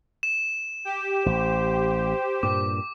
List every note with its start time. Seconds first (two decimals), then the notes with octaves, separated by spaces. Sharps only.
0.23 E7
0.85 G4
1.26 A1 C5
2.43 G2 A#2 D6